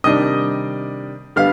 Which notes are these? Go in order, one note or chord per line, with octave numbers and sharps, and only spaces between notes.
C3 D#3 G3 D4 D#5 D#6
D3 G3 B3 F5 F6